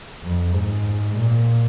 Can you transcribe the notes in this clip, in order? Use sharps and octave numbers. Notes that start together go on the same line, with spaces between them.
F2
G#2
A#2